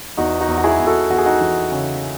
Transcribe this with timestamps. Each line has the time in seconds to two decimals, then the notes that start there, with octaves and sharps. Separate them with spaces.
0.17 E2 D#4 F#4
0.41 D#4 F#4
0.48 E2
0.58 F#4
0.64 E4 G#4
0.80 E2
0.87 F#4 A4
1.10 E2 F#4
1.18 G#4
1.26 D#4 F#4
1.41 E3
1.72 C#3